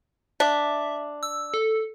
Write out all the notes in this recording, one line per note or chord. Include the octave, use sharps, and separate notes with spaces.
D4 E5
E6
A4